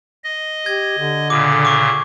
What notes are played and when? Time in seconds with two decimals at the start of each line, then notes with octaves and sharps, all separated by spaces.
0.24 D#5
0.66 G4 G#6
0.99 D3
1.30 A#2 C#3 D6
1.65 C#6 D6